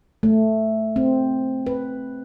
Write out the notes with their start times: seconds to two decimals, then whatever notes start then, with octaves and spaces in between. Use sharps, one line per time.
0.23 A3
0.96 C4
1.67 B4